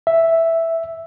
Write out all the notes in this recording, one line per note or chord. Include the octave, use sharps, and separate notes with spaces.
E5